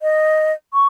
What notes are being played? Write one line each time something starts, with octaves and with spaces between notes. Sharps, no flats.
D#5
C#6